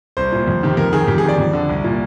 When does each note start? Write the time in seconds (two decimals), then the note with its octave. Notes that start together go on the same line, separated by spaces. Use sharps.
0.17 C2 C5
0.32 A#2
0.48 F2
0.63 C3 D#3
0.77 F2 A#4
0.93 D#3 G#4
1.08 F2 G4
1.18 G#4
1.24 D#3 D5
1.38 F2
1.53 D3
1.69 C2
1.84 A#2